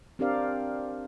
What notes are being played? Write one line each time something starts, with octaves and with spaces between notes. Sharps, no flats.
C4 D4 G4 A#4 D5 F5